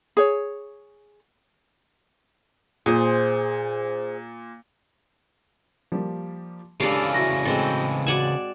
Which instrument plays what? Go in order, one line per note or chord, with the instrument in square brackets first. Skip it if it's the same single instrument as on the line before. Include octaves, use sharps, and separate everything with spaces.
[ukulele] G#4 C#5
[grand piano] A#2 [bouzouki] G#4 C5
[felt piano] F3 G3 A#3
[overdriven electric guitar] C#3 E3 [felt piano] G#3 D4 [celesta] G4 [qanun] A4 D5 F5
[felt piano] E4 E5 [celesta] F#4 C#6 A#6
[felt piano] A2 [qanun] G#3 C4 A4
[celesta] F#4 E7 [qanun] D5 F#5 G#5